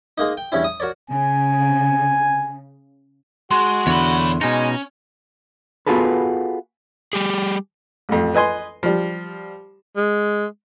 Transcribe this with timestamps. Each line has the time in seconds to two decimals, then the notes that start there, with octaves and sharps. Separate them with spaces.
0.18 G#3 A#3 D#4
0.37 G5
0.52 E2 G2 C#4 E4
0.64 D#6
0.80 F#4 A#4 C#5 D5
1.10 C#3 G#5
3.51 G#3 F#4 C6
3.87 E2 D3 C#5 B5
4.41 B2 G#3 C#4 D#4
5.87 B3 F4 F#4 G#4 A4 B4
7.13 G3 G4 G#4
8.09 A1 F2
8.34 B4 D#5 G#5 C6
8.83 F3 G3
9.97 G#3